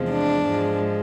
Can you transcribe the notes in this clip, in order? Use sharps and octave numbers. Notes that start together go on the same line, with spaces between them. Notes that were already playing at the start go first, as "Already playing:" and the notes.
Already playing: E2 C3 F3 G#3
D4
G#2 F3 G#3